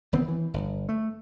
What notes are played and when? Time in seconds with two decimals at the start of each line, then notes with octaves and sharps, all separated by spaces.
0.13 E1 D#3 B3 C4
0.28 E3
0.54 G1
0.89 A3